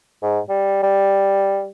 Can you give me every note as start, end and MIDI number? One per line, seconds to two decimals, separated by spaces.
0.22 0.40 44
0.49 0.80 55
0.83 1.68 55